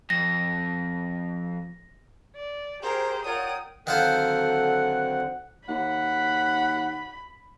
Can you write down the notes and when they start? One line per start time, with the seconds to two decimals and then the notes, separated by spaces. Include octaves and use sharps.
0.10 F2 A#6
2.35 D5
2.82 G4 G#4 A#4 C5 A#5
3.25 F4 A#4 C#5 D5 F#5 G5 D#6
3.87 D3 D#3 F#3 C4 F4 A4 C5 F#5
5.69 D#2 F#5 B5